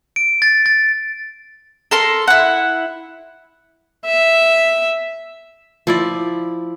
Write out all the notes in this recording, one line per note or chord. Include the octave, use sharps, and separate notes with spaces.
D7
A6
A6
A4 A#4 C6
E4 F#5
E5
F3 E4 D5